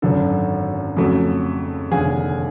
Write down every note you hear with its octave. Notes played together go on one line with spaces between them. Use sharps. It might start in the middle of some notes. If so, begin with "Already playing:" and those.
G#1 F#2 D3 A4
F2 C#3 F#3 A3
F1 D#2 D3 G#4